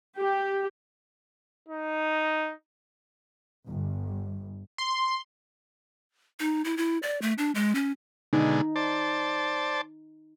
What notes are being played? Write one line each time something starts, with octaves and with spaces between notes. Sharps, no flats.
G4
D#4
G1
C6
D#4
E4
E4
D5
A3
D4
G#3
C#4
B2 D3 G#3 D#4
C5 D5 A5